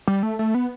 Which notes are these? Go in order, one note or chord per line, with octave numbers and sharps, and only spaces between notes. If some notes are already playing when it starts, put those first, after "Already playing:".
G3
A3
A3
B3